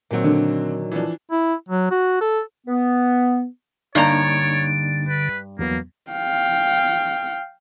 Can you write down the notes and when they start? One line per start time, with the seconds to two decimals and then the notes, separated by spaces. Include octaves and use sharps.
0.11 A#2 D#3 F#3 A#3 C4
0.24 D3
0.91 E3 F3 D4
1.31 E4
1.68 F#3
1.91 F#4
2.21 A4
2.67 B3
3.95 G2 D3 A#3 D4 D#4 C#5 A#5
5.08 B4
5.59 E2 F#3 A#3 B3
6.11 F5 G5